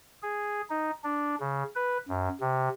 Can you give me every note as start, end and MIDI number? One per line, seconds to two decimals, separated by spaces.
0.23 0.62 68
0.70 0.91 63
1.04 1.35 62
1.40 1.63 49
1.76 1.98 71
2.09 2.29 42
2.41 2.69 48